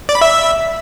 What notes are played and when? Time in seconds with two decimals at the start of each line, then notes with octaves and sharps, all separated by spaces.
0.09 D5
0.15 B5
0.21 E5